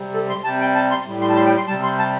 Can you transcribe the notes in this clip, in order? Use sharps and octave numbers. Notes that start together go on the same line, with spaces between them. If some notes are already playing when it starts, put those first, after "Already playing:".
Already playing: C3 G3
A4
C6
C3 G3 A5
G5
A5
C6
A2 G3
C6
A5
C6
G5
C6
C3 G3 A5
C6
A5